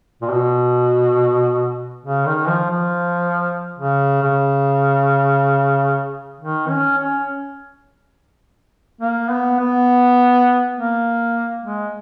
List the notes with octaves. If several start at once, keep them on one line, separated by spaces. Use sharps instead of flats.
A#2
B2
C#3
D#3
F3
F3
C#3
C#3
D#3
C#4
C#4
A#3
B3
B3
A#3
G#3